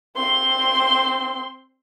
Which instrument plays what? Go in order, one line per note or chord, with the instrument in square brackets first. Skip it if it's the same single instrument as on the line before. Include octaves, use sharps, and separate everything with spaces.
[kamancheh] C4 C6